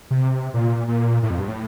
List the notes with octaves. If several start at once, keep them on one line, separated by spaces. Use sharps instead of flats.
C3
A#2
A#2
A2
F2
G2
A2